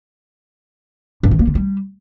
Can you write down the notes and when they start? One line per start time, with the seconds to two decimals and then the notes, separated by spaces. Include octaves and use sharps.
1.23 G2
1.31 D#3
1.39 A#3
1.47 D3
1.55 G3